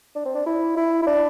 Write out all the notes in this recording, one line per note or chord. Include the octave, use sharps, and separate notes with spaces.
D4
C4
D4
E4
E4
E4
D4